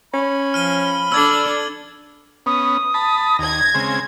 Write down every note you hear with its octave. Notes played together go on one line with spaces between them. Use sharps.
C#4 B5
F3 F6 D#7 G7
D4 A4 D5 E6 G#6 F#7
B3 C#4 D#6
A5 B5
D#2 G#6 A#6
C#3 G#3 C4